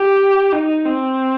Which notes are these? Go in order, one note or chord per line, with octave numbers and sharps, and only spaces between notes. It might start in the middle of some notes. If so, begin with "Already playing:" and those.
Already playing: G4
D#4
C4